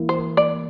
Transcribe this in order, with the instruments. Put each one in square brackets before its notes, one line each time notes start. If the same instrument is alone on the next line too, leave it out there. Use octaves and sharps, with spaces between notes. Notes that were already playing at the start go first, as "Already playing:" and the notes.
Already playing: [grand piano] E3 A#3 E4
[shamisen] C5
[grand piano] A#4
[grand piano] A#3 [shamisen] D5